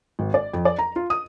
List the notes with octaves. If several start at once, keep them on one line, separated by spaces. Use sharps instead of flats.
G#1
D5
F2
D5
A#5
F4
D#6